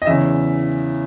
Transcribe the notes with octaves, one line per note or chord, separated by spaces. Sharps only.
D#5
E2 C#3 E3 E5